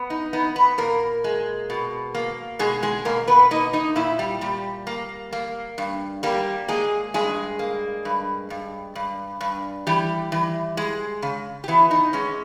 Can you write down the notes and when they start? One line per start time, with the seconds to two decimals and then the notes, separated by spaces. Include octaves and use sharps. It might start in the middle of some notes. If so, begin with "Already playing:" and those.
Already playing: B3
0.10 D#4
0.33 B3 D#4
0.56 B3 B4
0.78 A#2 A#3 A#4
1.24 G#3
1.70 B2
2.15 A#3
2.59 B2 G#3 G#4
2.83 G#3 G#4
3.05 B2 A#3 A#4
3.28 B3 B4
3.51 A#3 D#4 D#5
3.73 D#4 D#5
3.96 A#2 E4 E5
4.19 G3 G4
4.41 A#2 G3 G4
4.87 A#3
5.33 A#3
5.78 G2
6.23 G3 A#3 G4
6.68 G#3 A#3 G#4
7.14 G2 G#3 G#4
7.59 A#3
8.05 G2
8.50 G2
8.95 G2
9.41 G2
9.87 E3 G3 G4
10.32 E3
10.77 G#3
11.22 C#3
11.64 G4
11.68 E3 B3 E4
11.91 D#4
12.13 G#3 C#4